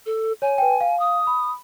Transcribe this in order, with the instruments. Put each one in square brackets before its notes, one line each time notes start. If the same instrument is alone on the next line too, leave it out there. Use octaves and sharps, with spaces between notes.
[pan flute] A4
[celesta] C#5 [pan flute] G#5
[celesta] B4 G5
F5
[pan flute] D#6
[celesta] B5